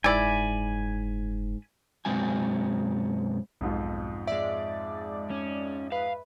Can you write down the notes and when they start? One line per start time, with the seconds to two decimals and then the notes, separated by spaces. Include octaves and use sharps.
0.04 F#1 G#2 E4 D5 G#5 B5
2.05 F#2 B2 G#3 C4 F#4 G#5
3.61 B1 F2 G#2 F4
4.27 G#3 D5 E5
5.30 C#4
5.92 B4 F5